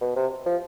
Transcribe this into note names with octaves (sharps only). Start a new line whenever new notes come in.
B2
C3
F3